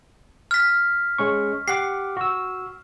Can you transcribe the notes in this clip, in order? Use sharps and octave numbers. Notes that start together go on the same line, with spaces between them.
F6 B6
G#3 C#4 C#6
G4 F#5 D6 C7
F#4 E6